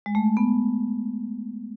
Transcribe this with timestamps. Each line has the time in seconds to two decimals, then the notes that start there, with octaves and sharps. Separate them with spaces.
0.06 G#3
0.15 A3
0.37 B3